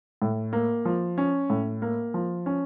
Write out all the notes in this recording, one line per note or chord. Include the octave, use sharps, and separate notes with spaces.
A2
A#3
F3
C#4
A2
A#3
F3
C#4